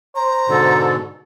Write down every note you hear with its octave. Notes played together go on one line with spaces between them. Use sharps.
C5 A#5
G#2 B2 D3 A4